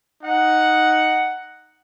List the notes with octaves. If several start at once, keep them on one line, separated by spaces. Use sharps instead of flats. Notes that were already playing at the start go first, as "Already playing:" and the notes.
D#4 F#5